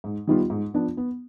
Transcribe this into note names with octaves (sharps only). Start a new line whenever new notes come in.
G#2
D#3 G3 B3 F4
G#2
F3 B3 D4
B3